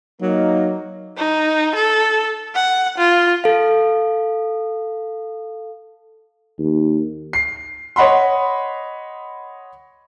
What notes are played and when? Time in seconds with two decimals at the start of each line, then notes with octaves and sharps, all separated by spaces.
0.22 F#3 A#3 D#4
1.17 D#4
1.75 A4
2.55 F#5
2.98 F4
3.44 A4 F5
6.59 D#2
7.33 C7
7.96 C#5 D#5 F#5 B5 C6